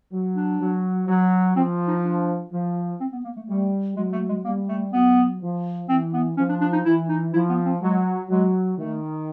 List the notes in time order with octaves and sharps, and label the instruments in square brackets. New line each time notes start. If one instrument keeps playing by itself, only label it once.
[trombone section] F#3
[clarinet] D4
[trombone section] F#3
F#3
[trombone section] F3 [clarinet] C4
[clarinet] D#4
D4
[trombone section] F3
[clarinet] C4
B3
A#3
A3
[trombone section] G3 [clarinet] A3
[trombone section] F#3 [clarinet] G#3
[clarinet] A3
G#3
[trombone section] G3 [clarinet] A#3
[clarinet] A3
[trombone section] F#3 [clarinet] B3
[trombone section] F3
[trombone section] E3 [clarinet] C4
[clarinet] B3
[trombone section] F3 [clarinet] C#4
[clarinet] D4
D4
D#4
[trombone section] E3 [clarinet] E4
[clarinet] D#4
[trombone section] F3 [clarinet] E4
[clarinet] B3
C4
[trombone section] F#3 [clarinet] G#3
[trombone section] F#3 [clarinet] G#3
[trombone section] D#3 [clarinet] A3